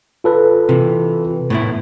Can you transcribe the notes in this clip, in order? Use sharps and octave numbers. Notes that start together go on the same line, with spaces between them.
F4 A4 B4
C3 E3
A2 B3 E4